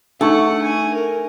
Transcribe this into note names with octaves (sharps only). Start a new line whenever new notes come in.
A3 D4 D#4 F#5 C#6
G#5
A#4